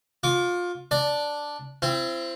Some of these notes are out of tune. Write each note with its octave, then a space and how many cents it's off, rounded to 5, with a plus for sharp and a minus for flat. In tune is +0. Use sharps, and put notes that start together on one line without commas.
F4 +20 D6 -35
D4 +0 D5 +0
C4 +0 E4 +45